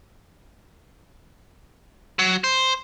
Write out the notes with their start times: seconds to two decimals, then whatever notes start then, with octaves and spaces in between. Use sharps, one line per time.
2.19 F#3
2.44 C5